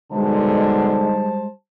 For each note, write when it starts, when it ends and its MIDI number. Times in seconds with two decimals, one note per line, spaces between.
0.12 1.29 47
0.12 1.29 50
0.12 1.49 55
0.12 1.47 56
0.12 1.29 63
0.12 1.49 72
0.12 1.49 81